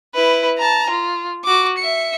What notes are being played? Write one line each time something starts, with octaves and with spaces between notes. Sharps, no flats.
E4 B4
A5 A#5
F4
F#4 D6
E5 C#7